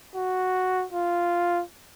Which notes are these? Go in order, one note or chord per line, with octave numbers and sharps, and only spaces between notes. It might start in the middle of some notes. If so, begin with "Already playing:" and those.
F#4
F4